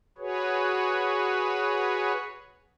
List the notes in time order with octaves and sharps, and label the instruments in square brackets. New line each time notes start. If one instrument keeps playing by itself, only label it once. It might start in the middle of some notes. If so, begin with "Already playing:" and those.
[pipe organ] F#4 G#4 B4 C#5